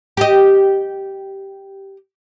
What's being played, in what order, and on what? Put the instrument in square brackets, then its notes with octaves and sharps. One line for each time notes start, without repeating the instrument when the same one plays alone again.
[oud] G4 D#5